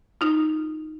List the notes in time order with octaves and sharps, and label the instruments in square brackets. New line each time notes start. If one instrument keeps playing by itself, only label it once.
[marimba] D#4 F4